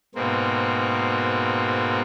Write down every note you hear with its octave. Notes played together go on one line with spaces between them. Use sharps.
G#2 B2 A#3 C4